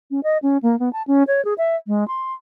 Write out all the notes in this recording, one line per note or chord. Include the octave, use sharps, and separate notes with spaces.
C#4
D#5
C#4
A#3
B3
A5
C#4
C#5
G#4
E5
G#3
C6